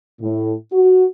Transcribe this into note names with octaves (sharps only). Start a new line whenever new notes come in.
A2
F#4